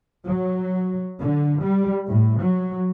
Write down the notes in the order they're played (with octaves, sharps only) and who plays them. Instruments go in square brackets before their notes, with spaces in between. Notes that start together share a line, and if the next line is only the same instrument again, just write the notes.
[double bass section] F#3
D3
G3
A2
F#3